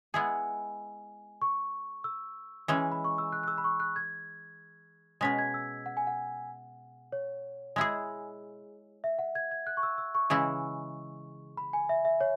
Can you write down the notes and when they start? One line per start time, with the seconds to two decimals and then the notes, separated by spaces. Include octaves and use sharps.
0.14 G#3 B3 E4 G#4 G#5
1.42 C#6
2.04 E6
2.68 E3 G#3 C#4
2.78 G#5
2.92 B5
3.04 C#6
3.18 E6
3.32 F#6
3.43 F#6
3.48 E6
3.58 B5
3.64 C#6
3.80 F#6
3.96 G#6
5.21 B2 G#3 C#4 G#4 B6
5.38 G#6
5.54 E6
5.86 F#5
5.97 G#5
6.07 F#5
7.12 C#5
7.76 G#3 E4 G#4
9.04 E5
9.19 F#5
9.35 G#6
9.51 G#6
9.67 F#6
9.77 C#6
9.83 E6
9.98 E6
10.15 C#6
10.30 C#3 E3 G#3 E4
11.57 B5
11.73 G#5
11.89 E5
12.05 E5
12.21 C#5